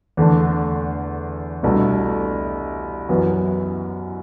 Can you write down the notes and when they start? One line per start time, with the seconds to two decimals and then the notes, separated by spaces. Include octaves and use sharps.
0.17 E2 D3 A3
1.63 C2 B2 A3 D4 A4
3.09 F#2 E3 B3 F#4